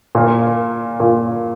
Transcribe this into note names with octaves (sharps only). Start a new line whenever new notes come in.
A#2 A#3 F4
A#2 A#3 F4